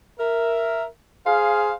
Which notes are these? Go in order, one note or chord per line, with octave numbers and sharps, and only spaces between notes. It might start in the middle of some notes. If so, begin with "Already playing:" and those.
A#4 E5
G#4 C5 F5